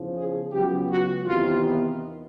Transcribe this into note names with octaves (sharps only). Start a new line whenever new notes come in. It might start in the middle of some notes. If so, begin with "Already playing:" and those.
Already playing: E2 C#3 F3
G#4
C#2 C#3 F#3 B3 G4
F#4
E2 C3 D#3 F4
B3